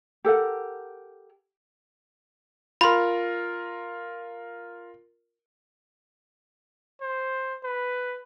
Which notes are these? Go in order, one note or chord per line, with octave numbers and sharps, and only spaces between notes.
G4 A4 A#4 F#5
F4 A#4 B5 C6
C5
B4